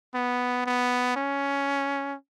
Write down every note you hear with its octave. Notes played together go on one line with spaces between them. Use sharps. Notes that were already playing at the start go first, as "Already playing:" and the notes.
B3
B3
C#4